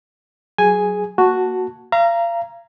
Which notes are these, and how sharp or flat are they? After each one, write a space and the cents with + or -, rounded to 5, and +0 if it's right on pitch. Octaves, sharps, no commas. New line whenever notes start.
F#3 +15 G#4 +5 G#5 +0
A#3 +0 F#4 +0 A5 +0
F5 -35 A#5 +0